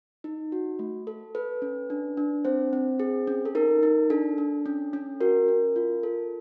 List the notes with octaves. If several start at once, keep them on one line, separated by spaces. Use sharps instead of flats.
D#4
F#4
A3
A4
A4 B4
C#4
D4
D4
C4 C5
C4
G#4
C#4
A4
D#4 A#4
D#4
D4 A4
D4
C#4
C#4
F#4 A#4
C#4
F4
A4